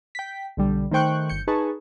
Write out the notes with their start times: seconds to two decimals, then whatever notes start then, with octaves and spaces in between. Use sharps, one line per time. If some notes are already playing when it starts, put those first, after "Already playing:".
0.15 G5 B6
0.57 B1 D3 G3
0.91 D#3 A3 C5 G5 C#6 F#6
1.29 G1 G6 C#7
1.47 D#4 G#4 B4 A5 C#6